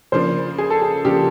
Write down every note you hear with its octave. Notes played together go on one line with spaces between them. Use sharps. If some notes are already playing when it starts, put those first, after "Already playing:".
C#3 F3 A#3 D4 F4 C5
G#4
A4
G#4
C#3 F3 A#3 D4 F4 G4